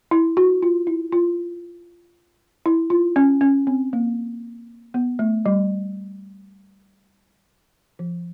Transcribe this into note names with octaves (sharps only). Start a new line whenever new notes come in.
E4
F#4
F4
E4
F4
E4
F4
C#4
C#4
C4
A#3
B3
A3
G3
F3